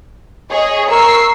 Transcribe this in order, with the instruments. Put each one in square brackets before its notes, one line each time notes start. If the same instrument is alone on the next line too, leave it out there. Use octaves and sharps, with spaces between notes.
[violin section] G#4 C#5 D#5
[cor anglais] A#4 [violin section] C#6 E6 C7